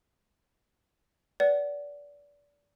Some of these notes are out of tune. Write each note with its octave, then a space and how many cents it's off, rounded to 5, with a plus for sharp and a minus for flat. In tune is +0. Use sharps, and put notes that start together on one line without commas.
B4 +0 D5 -25 F#5 +20